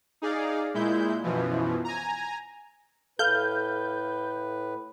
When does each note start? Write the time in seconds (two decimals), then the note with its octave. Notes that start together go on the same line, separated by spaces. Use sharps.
0.22 D#4 G#4 D5 F5
0.74 A#2 G#3 E4 G6
1.23 F#2 B2 E3 F3
1.85 G#5 A#5
3.19 A2 A4 B4 F5 F6 G6